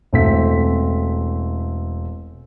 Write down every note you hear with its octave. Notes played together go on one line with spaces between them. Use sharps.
E1 A3 C4 E4 B6